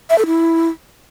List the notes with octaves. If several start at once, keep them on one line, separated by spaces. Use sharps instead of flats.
E5
A4
E4